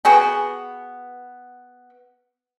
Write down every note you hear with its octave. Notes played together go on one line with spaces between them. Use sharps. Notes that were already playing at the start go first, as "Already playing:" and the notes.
B3 F#4 G#4 G5